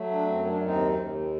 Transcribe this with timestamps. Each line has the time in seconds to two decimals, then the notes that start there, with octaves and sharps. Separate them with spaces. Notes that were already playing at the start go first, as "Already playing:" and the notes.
Already playing: F#3 A3
0.11 D4
0.27 F#2 C4
0.46 D4
0.62 D#2 C4 D#4
0.98 D#2